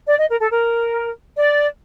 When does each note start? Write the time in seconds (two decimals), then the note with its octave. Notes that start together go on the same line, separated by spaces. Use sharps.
0.08 D5
0.18 D#5
0.29 A#4
0.40 A4
0.50 A#4
1.36 D5